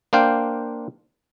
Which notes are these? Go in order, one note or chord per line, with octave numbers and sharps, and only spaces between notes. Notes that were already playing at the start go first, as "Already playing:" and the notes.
A#3 D4 C5 F5 G5